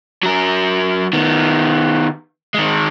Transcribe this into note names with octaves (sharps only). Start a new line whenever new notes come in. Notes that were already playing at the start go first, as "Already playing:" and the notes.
F#3 A#4
D#3 B3
D#3 G#3